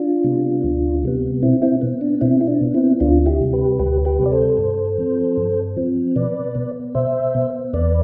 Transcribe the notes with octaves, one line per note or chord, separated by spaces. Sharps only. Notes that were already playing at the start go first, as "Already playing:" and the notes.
Already playing: D4 F4
C3 G3 B3
D2
C3 G3 B3
B2 C4 E4
C4 E4
B3
D4
B2 C4 E4
E4
D4
B3
C4 E4
D2 D4 F4
E4 G4
C3 G3
G4 B4
D2 G4 B4
G4 B4
C3 G3
D5
A4 C5
G2
F3 C4
G2
F3 C4
B2 B4 D5
B3
B2 C5 E5
B3
E2 B4 D5